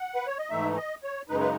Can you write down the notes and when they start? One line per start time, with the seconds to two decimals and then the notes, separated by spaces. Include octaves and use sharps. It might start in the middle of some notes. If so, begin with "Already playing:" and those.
Already playing: F#5
0.15 B4
0.26 C#5
0.39 D#5
0.50 G#2 E3 A3 D#4 E5
0.77 D#5
1.03 C#5
1.29 F#2 C#3 G#3 D#4 B4
1.40 B4